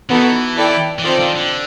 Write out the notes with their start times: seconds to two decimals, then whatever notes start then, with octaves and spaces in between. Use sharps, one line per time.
0.09 E3 B3 D#4 F#4 A4
0.57 E4 A4 D5 G5
0.99 E3
1.03 D#3 C4 F4 A4 D5
1.20 D#3
1.36 D3